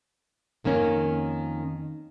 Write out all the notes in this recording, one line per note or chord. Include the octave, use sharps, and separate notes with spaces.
F2 D#3 A#3 C#4